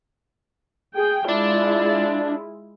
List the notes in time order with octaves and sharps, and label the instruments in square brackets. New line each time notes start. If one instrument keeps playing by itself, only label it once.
[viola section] G#4 G5
[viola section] G#3 E4 F4 [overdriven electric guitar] D4